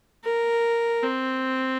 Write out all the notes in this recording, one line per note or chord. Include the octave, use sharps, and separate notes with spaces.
A#4
C4